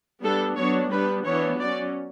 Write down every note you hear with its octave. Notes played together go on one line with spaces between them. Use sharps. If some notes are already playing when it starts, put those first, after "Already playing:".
G3 B3 D4 A4
F#3 B3 D4 C#5
G3 B3 D4 B4
E3 B3 D4 C#5
F#3 C#4 D5